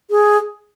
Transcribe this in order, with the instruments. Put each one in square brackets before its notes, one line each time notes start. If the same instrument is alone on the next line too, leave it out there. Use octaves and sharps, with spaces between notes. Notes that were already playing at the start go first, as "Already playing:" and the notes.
[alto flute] G#4